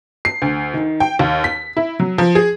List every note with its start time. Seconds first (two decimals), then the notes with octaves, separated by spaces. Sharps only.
0.25 C7
0.42 D2
0.74 D#3
1.00 G5
1.19 D#2
1.44 B6
1.77 E4
2.00 F#3
2.18 F3
2.35 G#4